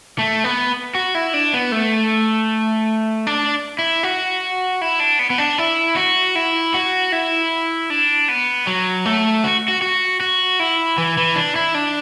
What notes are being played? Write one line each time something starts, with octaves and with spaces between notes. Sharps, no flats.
A3
B3
F#4
E4
D4
B3
A3
D4
E4
F#4
E4
D4
B3
B3
D4
E4
F#4
E4
F#4
E4
D4
B3
F#3
A3
F#4
F#4
F#4
F#4
E4
E3
E3
D4
E4
D4